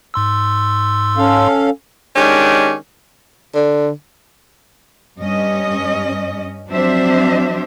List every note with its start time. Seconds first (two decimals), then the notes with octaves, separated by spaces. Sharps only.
0.14 G#2 C6 E6
1.17 C#4 A4 F5
2.16 D#3 G#3 C#4 D4 G4
3.55 D3
5.19 G2 C#4 D#5
6.69 F3 F#3 C4 D4 C5 E5